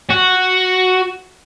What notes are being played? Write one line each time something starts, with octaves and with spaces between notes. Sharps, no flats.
F#4